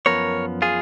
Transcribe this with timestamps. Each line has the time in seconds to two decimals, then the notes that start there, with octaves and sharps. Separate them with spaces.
0.06 F#2 F3 B3 A#4 C#5
0.62 F4 G#4